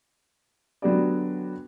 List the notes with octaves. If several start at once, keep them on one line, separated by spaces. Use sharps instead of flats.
D3 F#3 B3 F#4 G4 D5